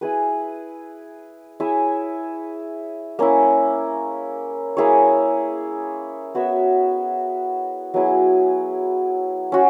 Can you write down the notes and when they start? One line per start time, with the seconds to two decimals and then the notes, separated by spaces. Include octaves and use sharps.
0.01 E4 G#4 B4
1.60 E4 G#4 C#5 E5
3.19 A#3 C#4 E4
4.77 A#3 E4 G#4 C#5
6.35 B3 F#4 C#5 E5
7.94 F#3 B3 E4 G#4
9.52 C#4 F#4